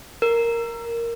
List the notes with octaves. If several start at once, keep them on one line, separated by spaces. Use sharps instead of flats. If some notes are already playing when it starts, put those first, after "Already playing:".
A#4